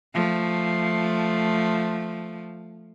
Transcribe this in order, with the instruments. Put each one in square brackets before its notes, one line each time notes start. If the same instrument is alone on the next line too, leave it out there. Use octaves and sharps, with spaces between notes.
[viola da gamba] F3 A3